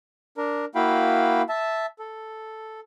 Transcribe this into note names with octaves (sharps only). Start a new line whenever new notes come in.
D4 A#4
A#3 E4 F#4 F5 G5 B5
E5 A5
A4